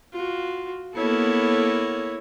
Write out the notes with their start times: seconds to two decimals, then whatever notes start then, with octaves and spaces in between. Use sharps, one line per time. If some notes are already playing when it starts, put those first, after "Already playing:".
0.13 F4 F#4
0.96 A#3 B3 E4 A4 C#5